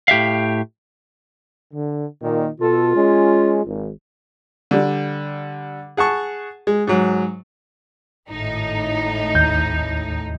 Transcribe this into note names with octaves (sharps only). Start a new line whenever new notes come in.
A2 G4 E5 F5
D3
A#2 D#3
B2 F4 A4
G#3 C#4
G#1
D3 G3
G#4 F#5 A5 C#6
G#3
G#2 F#3
G#1 A2 D#4
D#2 G6